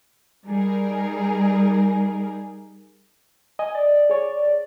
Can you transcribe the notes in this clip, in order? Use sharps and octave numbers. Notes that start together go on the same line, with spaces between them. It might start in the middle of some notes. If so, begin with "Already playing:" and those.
G3 D#4 G#4 A#4
D#5 G#5
D5
G#4 C#5